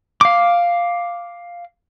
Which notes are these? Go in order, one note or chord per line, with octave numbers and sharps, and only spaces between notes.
F5 D6